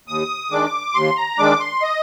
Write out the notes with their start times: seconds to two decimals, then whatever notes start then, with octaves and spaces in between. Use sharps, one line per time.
0.08 D#2 D#6
0.51 D#3 G#3 D4 D6
0.94 D#2 C6
1.17 A#5
1.38 D#3 G#3 D4 D6
1.60 C6
1.82 D#5